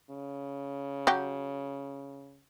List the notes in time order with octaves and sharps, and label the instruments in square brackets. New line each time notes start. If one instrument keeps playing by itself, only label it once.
[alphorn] C#3
[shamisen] F#3 G4 G5